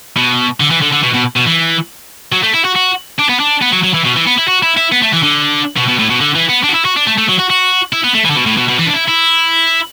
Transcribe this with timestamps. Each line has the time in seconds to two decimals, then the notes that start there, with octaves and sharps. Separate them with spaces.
0.17 B2
0.60 D3
0.71 E3
0.82 D3
0.92 D3
1.03 B2
1.14 B2
1.36 B2
1.46 E3
2.32 F#3
2.43 A3
2.54 E4
2.65 F#4
2.76 F#4
3.19 D4
3.29 B3
3.40 D4
3.62 B3
3.73 F#3
3.84 F#3
3.94 E3
4.05 B2
4.16 E3
4.27 B3
4.38 E4
4.48 F#4
4.63 E4
4.77 E4
4.92 B3
5.02 A3
5.13 E3
5.23 D3
5.77 B2
5.88 B2
5.99 A2
6.10 B2
6.21 D3
6.35 E3
6.49 B3
6.64 D4
6.69 F#4
6.74 E4
6.85 F#4
6.96 D4
7.07 A3
7.18 A3
7.28 F#3
7.39 F#4
7.50 F#4
7.93 E4
8.04 B3
8.14 A3
8.25 E3
8.30 D3
8.36 B2
8.47 A2
8.58 B2
8.69 B2
8.79 E3
8.87 D4
8.94 E4
9.09 E4